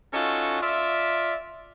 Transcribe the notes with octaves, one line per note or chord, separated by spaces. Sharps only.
C#4 D#4 F4 F#4 A4
F4 D5 E5